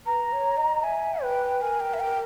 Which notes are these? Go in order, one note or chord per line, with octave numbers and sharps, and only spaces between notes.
B4 A#5
C#5
D#5
E5 G#5
B4 G5
A#4 G#5
G5
E5
G5